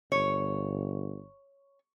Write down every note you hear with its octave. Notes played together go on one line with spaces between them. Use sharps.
G1 C#5